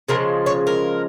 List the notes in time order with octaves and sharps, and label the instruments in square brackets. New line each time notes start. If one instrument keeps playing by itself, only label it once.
[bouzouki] C#3 F3 G#3 A#4
C#5
A#4